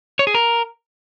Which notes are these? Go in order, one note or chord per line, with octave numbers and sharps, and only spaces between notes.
C#5
G#4
A#4